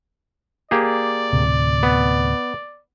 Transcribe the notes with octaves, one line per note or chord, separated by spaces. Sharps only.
A#3 G4 G#4 D5
D2 A2 C3
B3